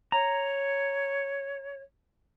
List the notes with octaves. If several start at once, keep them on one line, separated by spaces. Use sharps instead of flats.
C#5 A#5